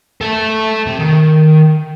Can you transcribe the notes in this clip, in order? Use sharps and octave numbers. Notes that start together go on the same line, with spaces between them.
A4 E5
C3
D#3